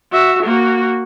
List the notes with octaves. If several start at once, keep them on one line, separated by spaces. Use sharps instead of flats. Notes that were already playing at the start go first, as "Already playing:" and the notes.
F#4 E5
A#3 F#4